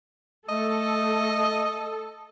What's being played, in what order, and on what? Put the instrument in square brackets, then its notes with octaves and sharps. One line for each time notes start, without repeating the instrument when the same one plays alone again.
[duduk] A3 [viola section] A4 [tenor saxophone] D#5